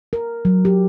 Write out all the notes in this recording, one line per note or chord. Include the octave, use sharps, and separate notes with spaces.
A#4
F#3
G4